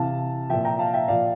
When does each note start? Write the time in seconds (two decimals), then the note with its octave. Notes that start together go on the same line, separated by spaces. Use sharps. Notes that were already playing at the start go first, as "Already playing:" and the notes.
Already playing: C3 E3 F5 A5
0.50 A#2 F3 E5 G5
0.65 G5 A#5
0.79 F5 A5
0.93 E5 G5
1.08 A#2 F3 D5 F5